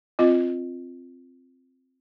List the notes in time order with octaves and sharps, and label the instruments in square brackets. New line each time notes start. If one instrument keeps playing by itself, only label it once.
[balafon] C4 F4 D#5